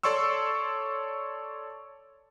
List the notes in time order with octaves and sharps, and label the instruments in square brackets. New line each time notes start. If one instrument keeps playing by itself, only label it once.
[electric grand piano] A4 C#5 D5 C6 C#6 E6